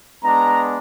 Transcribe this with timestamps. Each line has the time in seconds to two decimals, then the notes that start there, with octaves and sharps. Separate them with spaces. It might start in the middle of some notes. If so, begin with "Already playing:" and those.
0.23 G#3 B3 D4 A#5